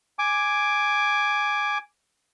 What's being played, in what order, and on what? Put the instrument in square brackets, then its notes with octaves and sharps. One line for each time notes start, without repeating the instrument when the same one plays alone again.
[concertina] G#5 D6